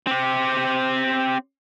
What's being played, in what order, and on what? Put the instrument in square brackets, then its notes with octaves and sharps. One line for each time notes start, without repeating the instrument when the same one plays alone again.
[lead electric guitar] C4 G4